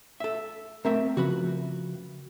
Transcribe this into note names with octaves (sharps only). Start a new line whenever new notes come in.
A4 E5
A3 C4 A#4 E5
C#3 F3 F#4 B4 B5